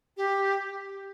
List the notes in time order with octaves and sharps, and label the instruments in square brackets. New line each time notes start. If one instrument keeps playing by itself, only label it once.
[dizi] G4